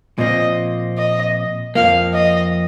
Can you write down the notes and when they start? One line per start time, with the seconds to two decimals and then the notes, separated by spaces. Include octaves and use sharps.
0.18 A#2 F3 C4 D#5
0.98 D#5
1.75 F2 F3 A#3 F5
2.14 D#5